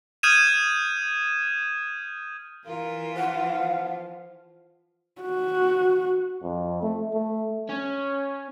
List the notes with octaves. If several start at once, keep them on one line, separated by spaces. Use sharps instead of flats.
D#6 F6 G6 G#6 D#7 E7
E3 F4 A#4
F3 F5 F#5
F#4
F2
A3
A3
C#4